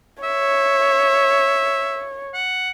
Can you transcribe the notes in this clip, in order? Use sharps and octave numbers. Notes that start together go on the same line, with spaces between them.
C#5 E5
F#5